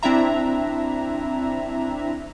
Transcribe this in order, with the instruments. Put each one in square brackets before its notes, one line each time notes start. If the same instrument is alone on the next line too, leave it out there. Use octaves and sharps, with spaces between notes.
[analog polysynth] C4 D4 E4 E5 A#5